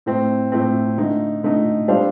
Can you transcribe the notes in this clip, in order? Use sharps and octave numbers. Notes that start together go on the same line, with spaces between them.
A2 A3 C4
A2 A3 C4
D3 A3 D#4
D3 A3 D#4
G3 D4 A4 C5 F5